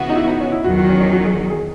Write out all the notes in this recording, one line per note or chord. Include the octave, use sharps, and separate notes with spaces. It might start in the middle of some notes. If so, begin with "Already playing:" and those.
Already playing: C#3 E3 B3 F#4
D#4
E4
D#4
C#4
E4
E2 D#3 F#3 F#4
F#4
C#4
C#4
F#4
G#4
G#4